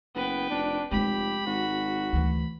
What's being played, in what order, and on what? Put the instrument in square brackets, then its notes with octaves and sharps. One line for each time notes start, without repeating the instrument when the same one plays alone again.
[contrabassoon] F#1 [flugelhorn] B3 [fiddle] B4 G5
[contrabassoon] F1 [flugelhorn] D4
[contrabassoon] F1 [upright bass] G#3 C4 [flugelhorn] G4 [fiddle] B5
[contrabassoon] G#1 [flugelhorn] F#4
[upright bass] D2 E3